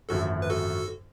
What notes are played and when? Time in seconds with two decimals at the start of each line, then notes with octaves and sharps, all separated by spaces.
0.09 G#1 F#2 D3 F3 A3 F#4 A4
0.42 B4
0.50 F#4 A4